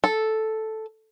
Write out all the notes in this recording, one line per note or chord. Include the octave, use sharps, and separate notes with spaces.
A4